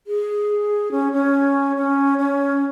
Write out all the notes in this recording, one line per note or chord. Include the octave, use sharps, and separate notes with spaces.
G#4
C#4
C#4
C#4
C#4